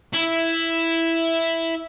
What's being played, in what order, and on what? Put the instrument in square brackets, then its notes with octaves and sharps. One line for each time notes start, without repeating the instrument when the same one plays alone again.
[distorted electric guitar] E4